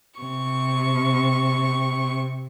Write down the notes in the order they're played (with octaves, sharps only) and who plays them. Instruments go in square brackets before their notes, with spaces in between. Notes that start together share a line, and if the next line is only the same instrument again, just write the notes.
[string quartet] C3 C#6